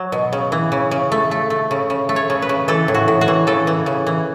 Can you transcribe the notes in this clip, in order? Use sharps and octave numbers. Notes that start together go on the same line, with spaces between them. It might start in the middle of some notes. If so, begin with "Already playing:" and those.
Already playing: F#3
B2
C#3
E3
C#3
C#3
A3
A3
A3
C#3
C#3
A3
C#5
C#3
B4
C#3
E3 A4
A2
F#4
A2
F#4
E3
C#3 A4
E3
C#3
E3